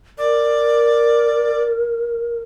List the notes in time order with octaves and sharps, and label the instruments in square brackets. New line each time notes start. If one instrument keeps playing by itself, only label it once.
[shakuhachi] A#4 [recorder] D5